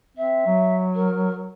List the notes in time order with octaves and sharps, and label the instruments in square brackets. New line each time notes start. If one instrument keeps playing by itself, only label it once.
[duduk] C4 [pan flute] E5
[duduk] F#3
[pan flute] A#4